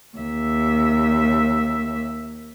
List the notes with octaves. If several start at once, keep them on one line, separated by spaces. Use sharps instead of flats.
D#2 E5